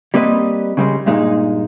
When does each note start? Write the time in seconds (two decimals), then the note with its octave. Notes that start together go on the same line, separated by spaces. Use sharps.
0.14 G3 A#3 C4 B4 D#5
0.77 C#3 G3 G#3
1.06 G2 A#2 G#3 D#4